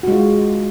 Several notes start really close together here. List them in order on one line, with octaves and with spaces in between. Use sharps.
F#4 G#3 F4